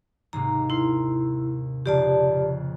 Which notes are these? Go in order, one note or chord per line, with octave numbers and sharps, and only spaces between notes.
D#2 G#2 C3 A#5
E4 A#4 C6
A#1 F2 C#3 G4 D5 A5